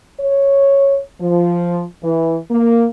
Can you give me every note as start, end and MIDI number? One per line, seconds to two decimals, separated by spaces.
0.19 0.98 73
1.20 1.83 53
2.03 2.37 52
2.50 2.86 58